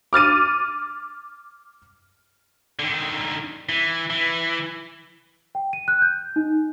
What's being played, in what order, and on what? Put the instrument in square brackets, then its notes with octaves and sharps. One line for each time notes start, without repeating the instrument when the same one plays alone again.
[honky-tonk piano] D6 F6 A6 D#7
[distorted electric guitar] D3 D#3
E3
E3
[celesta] G5
D#7
F#6
G6
D#4